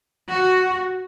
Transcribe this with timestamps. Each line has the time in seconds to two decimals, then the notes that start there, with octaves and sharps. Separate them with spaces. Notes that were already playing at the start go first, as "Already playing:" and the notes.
0.30 F#4